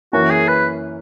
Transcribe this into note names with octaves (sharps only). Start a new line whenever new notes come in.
F#2 E3 A#3 C#4 F#4
G#4
B4